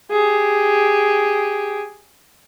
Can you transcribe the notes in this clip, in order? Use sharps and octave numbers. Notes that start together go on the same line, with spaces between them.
G4 G#4